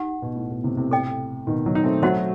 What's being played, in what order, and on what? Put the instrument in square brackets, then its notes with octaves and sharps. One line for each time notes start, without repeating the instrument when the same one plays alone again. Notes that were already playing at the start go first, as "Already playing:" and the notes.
Already playing: [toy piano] D#4 G4 F#5
[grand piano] B2
A2
B2
A2 C3
A2 C3
[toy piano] A4 D#5 G5
[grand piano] B2 D#3
D#3 F#3
D#4
A3 C4
[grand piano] F#3 A3 [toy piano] F#4 C5 D#5 F#5